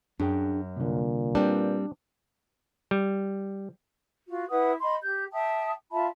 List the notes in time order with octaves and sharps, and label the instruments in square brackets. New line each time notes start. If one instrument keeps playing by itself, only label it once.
[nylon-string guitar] F#2 [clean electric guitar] D4 G#4 G5
[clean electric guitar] C2 D3 [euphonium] A#2
[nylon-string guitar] G3 C4 [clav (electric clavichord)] D4 [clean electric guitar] B4
[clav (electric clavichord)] G3
[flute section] F4 F#4
E4 B4 F#5 D#6
D#5 B5 C6
G4 G6
E5 G5 A5 D#6
F4 E5 A5 B5